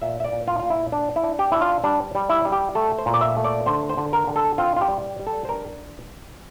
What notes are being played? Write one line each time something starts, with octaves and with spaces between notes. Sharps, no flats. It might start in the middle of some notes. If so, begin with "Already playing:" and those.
A#2 E5
E5
D5
A#2
F4
A#2 F4
E4
D4
E4
D4
G4
D4 E4
F4
G3 D4
G3
E4
G3
G4
A3 A4
C5
A#2
D5
E5
A3
D5
D3 C5
C5
D3
A#4
D3
A4
C4 F4
F4
G4
G3
G3
A4
C5
D4 A#4